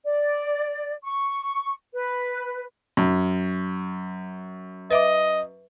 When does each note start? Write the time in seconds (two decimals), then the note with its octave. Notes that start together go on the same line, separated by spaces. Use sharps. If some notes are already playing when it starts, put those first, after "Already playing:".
0.05 D5
1.04 C#6
1.93 B4
2.97 F#2
4.91 B4 D#5 E5 D6